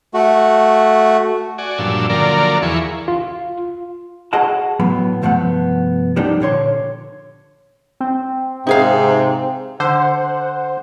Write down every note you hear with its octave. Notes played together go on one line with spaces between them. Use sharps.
A3 F#4
F#4 D5 G#5
G2 A#2 F3 F#3 D4 E6
D3 F3 F#3 A#3 A#4 D5
E2 F3 E4 G#4 C#6
F4
F#4 G#4 D#5 F#5 A5
A2 F#3 B3 B5
C2 G2 F3 A3 B3 F#5
F3 G3 A#3 D4 D#4 G4
A#2 D3 C#5 C6
C4
G#2 C3 D#4 G#4 F5
D3 C5 F#5